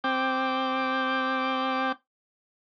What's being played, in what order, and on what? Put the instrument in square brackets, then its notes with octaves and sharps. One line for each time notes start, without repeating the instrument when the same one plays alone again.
[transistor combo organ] C4 G5 D6